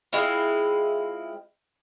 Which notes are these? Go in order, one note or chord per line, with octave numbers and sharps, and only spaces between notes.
G#3 C4 E4 F4